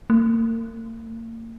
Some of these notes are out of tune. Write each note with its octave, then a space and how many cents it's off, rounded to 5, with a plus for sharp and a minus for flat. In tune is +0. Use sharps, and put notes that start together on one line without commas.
A#3 -40